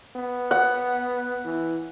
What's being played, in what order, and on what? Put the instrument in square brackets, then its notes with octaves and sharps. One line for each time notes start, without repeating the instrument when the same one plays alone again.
[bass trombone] B3
[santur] F#5
[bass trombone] E3